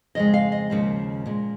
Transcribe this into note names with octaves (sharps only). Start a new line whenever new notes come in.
F2 C#3 G#3 D#5
F5
D#5
D#2 C#3 F3 G#3
A#2 G#3